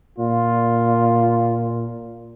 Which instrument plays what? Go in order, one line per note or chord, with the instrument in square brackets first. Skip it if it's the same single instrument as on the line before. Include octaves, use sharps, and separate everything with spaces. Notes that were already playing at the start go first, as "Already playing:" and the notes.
[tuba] A#2 [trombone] F4